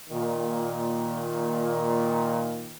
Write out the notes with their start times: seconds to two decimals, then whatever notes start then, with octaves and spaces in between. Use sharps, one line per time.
0.10 A#2 D#3